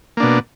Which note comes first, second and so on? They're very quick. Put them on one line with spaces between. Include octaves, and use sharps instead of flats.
A#3 D4 B2